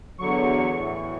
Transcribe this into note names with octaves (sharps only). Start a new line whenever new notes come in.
E2 D3 F#3 C#6
A2 E3